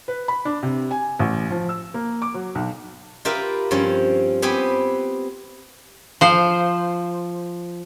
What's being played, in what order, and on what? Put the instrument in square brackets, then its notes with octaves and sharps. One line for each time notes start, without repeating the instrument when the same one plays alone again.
[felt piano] B4
B5
D4
C3
G#5
A1
F3
E6
A#3
D6
F#3
B1
[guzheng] F4 G4 A#4 B4 E5
G2 F3 C4 C#4
B3 C4 G4 B4 C5 G#5
[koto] F3 C5